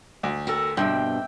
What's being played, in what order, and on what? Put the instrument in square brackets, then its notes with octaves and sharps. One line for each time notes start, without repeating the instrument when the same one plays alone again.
[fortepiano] D2
[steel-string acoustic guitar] F#4 [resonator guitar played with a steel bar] A4 A#4 G5
[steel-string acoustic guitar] G2 B2 [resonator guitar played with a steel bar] C4 D4 [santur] E5 G5